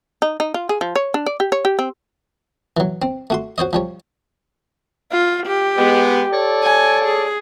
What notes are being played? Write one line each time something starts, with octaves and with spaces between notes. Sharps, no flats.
D#4
D#4
F4
G#4
F3
C#5
D4
D5
G4
C#5
G4
C4
E3 F#3
C4
A3 F#4 C6
F#4 C5 C#5 D#5
F3 G3 C#5
F4
G4
G#3 B3
A4 C#5 D5
G#5
G#4